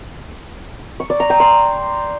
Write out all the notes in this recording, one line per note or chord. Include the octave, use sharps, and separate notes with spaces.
C#6
D5
A#5
G5
C6